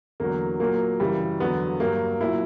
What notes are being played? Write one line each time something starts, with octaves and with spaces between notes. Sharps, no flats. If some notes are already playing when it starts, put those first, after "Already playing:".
E2 D3 F#3 A#3
A#2 F#3 A#3
F#2 C#3 E3 G3
E2 D3 F#3 B3
G2 F#3 A#3
A#2 F#3 E4